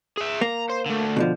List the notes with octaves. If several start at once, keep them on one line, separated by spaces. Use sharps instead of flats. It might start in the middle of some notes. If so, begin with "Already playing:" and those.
G#4 E5
A#3 A#5
C5
D3 A3
B2 D3 F3